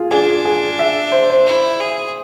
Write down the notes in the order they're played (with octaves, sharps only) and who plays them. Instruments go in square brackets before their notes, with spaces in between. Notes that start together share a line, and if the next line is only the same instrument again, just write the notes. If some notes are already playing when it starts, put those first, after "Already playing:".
Already playing: [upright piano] F4 G#4
[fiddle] D4 [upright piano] G#4
[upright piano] G#4
E5
C5
C5
[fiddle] E4
G#4